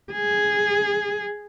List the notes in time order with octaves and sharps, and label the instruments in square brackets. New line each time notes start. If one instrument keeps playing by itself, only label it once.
[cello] G#4